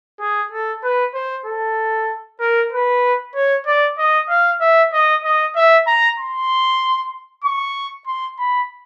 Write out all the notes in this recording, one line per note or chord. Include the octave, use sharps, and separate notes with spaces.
G#4
A4
B4
C5
A4
A#4
B4
C#5
D5
D#5
F5
E5
D#5
D#5
E5
A#5
C6
C#6
C6
B5